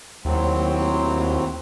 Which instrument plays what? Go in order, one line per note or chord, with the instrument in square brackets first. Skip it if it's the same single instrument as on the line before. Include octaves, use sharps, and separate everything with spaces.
[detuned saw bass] D#2 [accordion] A2 F#3 C4